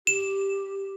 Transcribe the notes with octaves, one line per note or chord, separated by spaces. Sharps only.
G4 E7